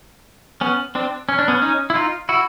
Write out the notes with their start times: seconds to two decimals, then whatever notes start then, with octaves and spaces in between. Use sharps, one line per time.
0.61 B3 C#4
0.95 C4 D4
1.29 C#4
1.39 D4
1.48 B3 C#4
1.62 C#4 D#4
1.90 E4
1.95 D#4 F4
2.29 E4 F#4